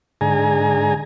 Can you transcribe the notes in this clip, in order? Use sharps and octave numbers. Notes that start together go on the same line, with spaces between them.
G#2 D3 G#4 G#5 A#5